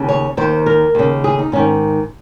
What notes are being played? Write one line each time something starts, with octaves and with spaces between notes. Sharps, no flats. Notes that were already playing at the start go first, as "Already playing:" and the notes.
Already playing: D#2 C#3
C#5
D#2 D#3 C5
A#4
D#2 C#3
G#4
D#4
G#2 D#3 C#4